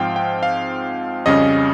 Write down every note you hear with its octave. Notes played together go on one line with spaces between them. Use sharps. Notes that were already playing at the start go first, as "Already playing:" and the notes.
Already playing: G#2 F3 C4 F5 G5
G5
F5
F2 C#3 G3 C#4 D#5